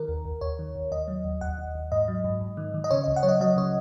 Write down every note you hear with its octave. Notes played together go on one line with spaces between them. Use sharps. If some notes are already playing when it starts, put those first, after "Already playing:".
Already playing: D#3 A#4
D#2
D#2
D#2 C#5
D#3
D#2
D#2 D#5
F#3
D#2
D#2 F#5
D#2
D#2
G#2 D#5
F#3
G#2
G#2
D#3
D#3
D#5
C#3 C#5
D#5
C#2
F#5
F#3 C#5
D#5
F#3 D#5
C#3 C#5